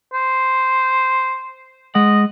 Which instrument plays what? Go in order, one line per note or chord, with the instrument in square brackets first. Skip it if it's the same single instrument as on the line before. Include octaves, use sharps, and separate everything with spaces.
[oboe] C5
[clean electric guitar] G#3 F#5 [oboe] D#5